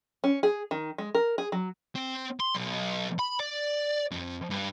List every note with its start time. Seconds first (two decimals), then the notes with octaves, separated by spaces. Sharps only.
0.24 C#4
0.43 G#4
0.71 D#3
0.98 G#3
1.15 A#4
1.38 G#4
1.52 F#3
1.95 C4
2.40 C6
2.55 B1
3.19 B5
3.40 D5
4.12 F2
4.51 G2